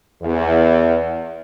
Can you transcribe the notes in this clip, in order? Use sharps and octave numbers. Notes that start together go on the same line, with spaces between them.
E2